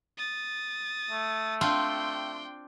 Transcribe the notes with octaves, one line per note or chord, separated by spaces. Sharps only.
D#6 A6
A3
C4 D4 F4 G5 C6